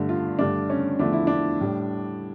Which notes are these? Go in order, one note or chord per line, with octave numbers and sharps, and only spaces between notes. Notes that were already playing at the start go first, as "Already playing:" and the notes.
Already playing: G2 D3 A3
F4
G2 D3 A3 D4
C#4
E2 D3 F3 A3 D4
E4
D4
A2 G3